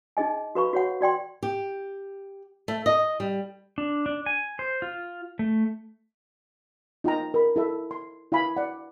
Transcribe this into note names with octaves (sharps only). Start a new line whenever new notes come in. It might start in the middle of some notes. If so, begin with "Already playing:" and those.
D#4 G#4 D#5 G#5
F#4 A4 B4 F5 B5 C#6
F#4 C#5 F#5
F#4 D5 G5 C6
G4
A3
D#5
G3
D4
D4
G#5
C5
F4
A3
D#4 F4 G5 A#5
A#4 B5
E4 A4 E5 B5
C6
E4 F5 G#5 B5
D5 F#5